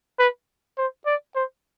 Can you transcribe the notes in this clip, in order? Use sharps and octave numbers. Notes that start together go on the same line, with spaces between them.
B4
C5
D5
C5